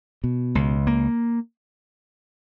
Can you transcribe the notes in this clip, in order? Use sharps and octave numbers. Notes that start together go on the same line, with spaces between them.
B2
C#2
A#3